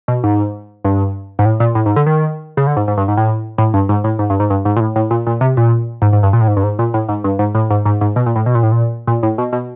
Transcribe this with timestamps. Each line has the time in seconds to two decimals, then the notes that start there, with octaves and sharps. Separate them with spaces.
0.08 B2
0.24 G#2
0.85 G2
1.39 G#2
1.45 A2
1.60 A#2
1.75 A2
1.86 G#2
1.96 D3
2.06 D#3
2.57 C#3
2.67 D3
2.77 G#2
2.88 G#2
2.97 G2
3.08 G#2
3.17 A2
3.58 A2
3.74 G2
3.89 G#2
4.04 A2
4.19 G#2
4.30 G2
4.40 G#2
4.50 G2
4.65 G#2
4.76 A#2
4.80 A2
4.96 A2
5.11 A#2
5.27 A#2
5.41 C3
5.57 A#2
6.02 G#2
6.13 G#2
6.23 G2
6.33 A#2
6.41 A2
6.48 G#2
6.57 G2
6.64 G#2
6.79 A#2
6.94 A2
7.09 G#2
7.24 G2
7.39 G#2
7.55 A2
7.70 G#2
7.85 G#2
8.01 G#2
8.16 B2
8.26 A#2
8.36 A2
8.46 B2
8.55 A#2
8.63 A2
8.72 A#2
9.07 A#2
9.23 A2
9.38 B2
9.53 B2